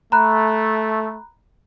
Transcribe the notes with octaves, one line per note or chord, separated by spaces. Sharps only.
A3 A#5 B5 F#6